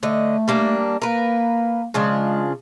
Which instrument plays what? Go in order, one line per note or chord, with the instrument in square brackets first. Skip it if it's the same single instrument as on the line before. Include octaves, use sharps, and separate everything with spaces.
[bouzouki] D3 D#5 [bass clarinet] A3
[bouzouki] G3 A#3 D4
[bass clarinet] A#3 [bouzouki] A#4 B4
[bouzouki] C#3 F3 D4 [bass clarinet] G#3